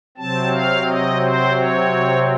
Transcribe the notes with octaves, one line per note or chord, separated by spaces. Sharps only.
C3 F#3 C4 A5
F5
D#5
C5
C#5